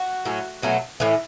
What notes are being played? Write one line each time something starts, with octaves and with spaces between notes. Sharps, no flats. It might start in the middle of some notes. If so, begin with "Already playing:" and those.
Already playing: F#4
A2 F#3 C#4
B2 F#3 A3 C#4
A2 E3 C#4